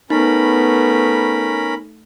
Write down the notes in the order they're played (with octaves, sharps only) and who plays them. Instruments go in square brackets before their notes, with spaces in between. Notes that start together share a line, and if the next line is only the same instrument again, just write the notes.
[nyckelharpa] A3 [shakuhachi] B3 [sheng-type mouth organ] C#4 A#4 B5 [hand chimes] D#4